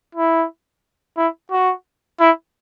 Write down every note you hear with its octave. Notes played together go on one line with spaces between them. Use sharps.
E4
E4
F#4
E4